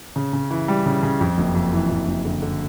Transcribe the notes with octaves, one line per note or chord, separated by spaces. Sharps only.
C#3
C#3
E3
G3
C#3
C#3
F2
F#1
F2
E3
F2
F#1
D3
D3